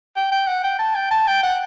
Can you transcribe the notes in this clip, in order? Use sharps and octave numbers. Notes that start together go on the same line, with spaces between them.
G5
G5
F#5
G5
A5
G5
A5
G5
F#5